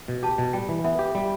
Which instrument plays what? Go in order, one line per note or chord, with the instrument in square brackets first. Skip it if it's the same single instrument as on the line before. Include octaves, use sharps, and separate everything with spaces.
[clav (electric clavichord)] B2
[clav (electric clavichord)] G4 [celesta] A5
[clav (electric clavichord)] B2
[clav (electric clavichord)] G3 [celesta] G5
[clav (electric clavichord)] E3
[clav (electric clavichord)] B3 [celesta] E5
[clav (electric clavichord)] G4
G3